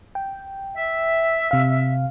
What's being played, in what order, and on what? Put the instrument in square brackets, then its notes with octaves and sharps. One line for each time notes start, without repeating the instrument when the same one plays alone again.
[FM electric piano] G5
[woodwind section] E5
[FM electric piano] C3 F5